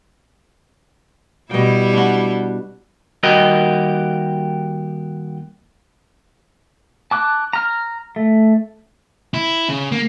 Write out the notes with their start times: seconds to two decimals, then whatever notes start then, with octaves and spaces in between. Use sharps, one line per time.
1.51 B2 G3 E4 G5
1.93 D4 F#4
3.23 D#2 G3 F#4 G4 A#4 D#5
7.11 A5 D6 F#6
7.53 A#5 F6
8.16 A3
9.34 E4
9.69 C#3
9.92 A#3